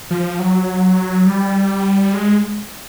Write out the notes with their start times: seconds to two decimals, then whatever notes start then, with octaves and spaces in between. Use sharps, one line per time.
0.11 F3
0.39 F#3
1.26 G3
2.13 G#3